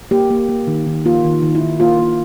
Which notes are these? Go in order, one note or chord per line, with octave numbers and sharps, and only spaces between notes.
A#3 G4
A#3
A#3
D#3
D#3
A#3 F4
D#3
D#3
E4
D#3
A#3 F4
A#3